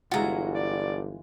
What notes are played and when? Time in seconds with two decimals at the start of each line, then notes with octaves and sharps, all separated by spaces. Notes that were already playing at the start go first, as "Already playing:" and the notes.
0.11 G1 E3 G#3 F4 F#4 A#5
0.55 D5